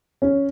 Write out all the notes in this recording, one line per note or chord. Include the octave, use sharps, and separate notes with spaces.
C#4